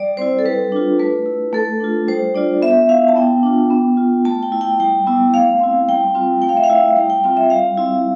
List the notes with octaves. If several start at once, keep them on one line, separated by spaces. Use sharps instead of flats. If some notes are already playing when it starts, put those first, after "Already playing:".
Already playing: G3 D5
C4 E4 C5
A4
G3 B4
D4 F4
A3 B4
E4
A3 A4
D4 F4
G3 C5
D4 F4 D5
B3 E5
E4 F5
A5
B3 G5
D4 F4
B3
F4
A3 A5
G5
E4
G5
G3 G5
B3 E4
A3 F5
C4 E4
G3 G5
C4 F4
A3 G5
F5
E5
F5
E4
G3 G5
G5
C4 F4 G5
E5
G3 F5
C4 E4